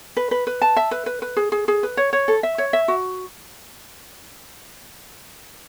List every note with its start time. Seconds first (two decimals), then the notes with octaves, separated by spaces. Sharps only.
0.17 B4
0.31 B4
0.47 B4
0.62 A5
0.76 E5
0.91 B4
1.06 B4
1.22 B4
1.37 G#4
1.52 G#4
1.68 G#4
1.83 B4
1.97 C#5
2.13 C#5
2.28 A4
2.43 E5
2.58 C#5
2.73 E5
2.88 F#4